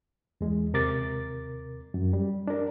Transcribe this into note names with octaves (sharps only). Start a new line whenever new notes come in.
E2 G#3
D#2 C3 A#4 D6 A6
F#2
G3
D4 A#4